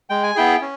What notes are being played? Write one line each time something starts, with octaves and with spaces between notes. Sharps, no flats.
G#3 G5
G#5
B3 E4 G#4 G5
C#4